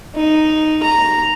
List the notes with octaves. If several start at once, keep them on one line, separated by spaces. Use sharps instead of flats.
D#4
A#5